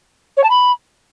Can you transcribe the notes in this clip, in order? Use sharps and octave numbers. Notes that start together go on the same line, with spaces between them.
C#5
A5
B5